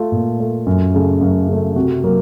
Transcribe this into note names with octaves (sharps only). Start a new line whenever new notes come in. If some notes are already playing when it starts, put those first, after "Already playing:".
Already playing: A3 F4
A#2
A3
F#2
C#3 A3
F#2
C#3 A3
C3 F#4
F#3 A#3